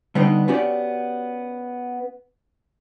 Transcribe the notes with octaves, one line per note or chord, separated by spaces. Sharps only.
D3 G3 B3 D4 D#4
B3 C#4 F#4 G4 D5